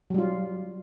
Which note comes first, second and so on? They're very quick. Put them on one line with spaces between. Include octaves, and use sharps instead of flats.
F#3 G3 F4